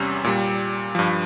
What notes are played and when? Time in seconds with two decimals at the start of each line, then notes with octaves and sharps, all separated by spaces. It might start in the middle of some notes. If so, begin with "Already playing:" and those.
Already playing: E2 C3 G3 C#4
0.24 A#2 G3
0.95 G2 F3